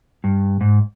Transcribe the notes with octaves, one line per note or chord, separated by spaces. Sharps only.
G2
G#2